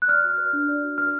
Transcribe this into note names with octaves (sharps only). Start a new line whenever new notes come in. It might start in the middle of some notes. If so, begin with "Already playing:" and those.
F#6
D5 F6
F#4
B4
D4
D5
F#4
B4 F6